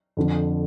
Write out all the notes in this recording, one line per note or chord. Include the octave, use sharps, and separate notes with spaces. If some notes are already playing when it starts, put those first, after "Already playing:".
F2 D3 F3